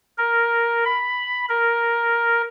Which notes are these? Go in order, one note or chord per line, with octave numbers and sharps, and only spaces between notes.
A#4
B5
A#4